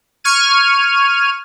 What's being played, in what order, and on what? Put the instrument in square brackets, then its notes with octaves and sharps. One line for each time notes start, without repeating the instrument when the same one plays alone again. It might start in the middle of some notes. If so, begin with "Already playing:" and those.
[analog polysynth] C#6 F6 G#6 D#7